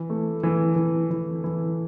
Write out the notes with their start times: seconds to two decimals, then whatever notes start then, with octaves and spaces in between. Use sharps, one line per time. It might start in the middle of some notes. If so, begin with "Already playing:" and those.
Already playing: E3
0.10 A3
0.43 E3
0.76 E3
1.10 E3
1.44 E3